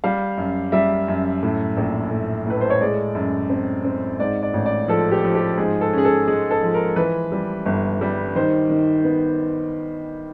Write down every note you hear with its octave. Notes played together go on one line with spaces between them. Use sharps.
G3 F5
F#2
G3 E5
F#2
A2
A#1
A2
A2 B4
C5
C#5
G#3 D5
F#2
C4
C4
G#2 D5
D5
A1
D5
F3 A4
G4
F3
G4
G#2 G#4
A4
C#4 G#4
A4
G#3 G#4
A4
F3
A#4
E3 B4
G3
G1
G3
D#3 C5
D#3
B3